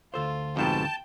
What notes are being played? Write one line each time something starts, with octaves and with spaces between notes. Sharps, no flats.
D2 F4 A4 C5
F2 G#2 B2 G5 A5